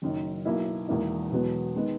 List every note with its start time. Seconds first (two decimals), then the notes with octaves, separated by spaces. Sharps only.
0.02 F#1 F#2 D#3
0.45 B1 B2 A#3 E4
0.88 E1 E2 D#3 A#3 E4
1.31 E1 E2 B2 F#3 B3
1.76 D#3 G#3 B3 D#4